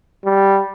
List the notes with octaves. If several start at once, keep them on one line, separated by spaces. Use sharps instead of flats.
G3